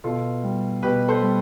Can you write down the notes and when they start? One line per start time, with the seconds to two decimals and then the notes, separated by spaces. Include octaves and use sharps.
0.04 B2 F4 A4
0.43 G3
0.83 B2 G4 B4
1.08 A4 C5
1.22 G3